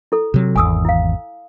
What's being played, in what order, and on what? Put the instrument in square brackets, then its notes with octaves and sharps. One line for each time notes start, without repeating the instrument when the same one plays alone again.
[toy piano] E4 A4
[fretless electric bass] C3 F#3
[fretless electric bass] G#1 E2 [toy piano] G#5 D#6 E6
[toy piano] E4 F5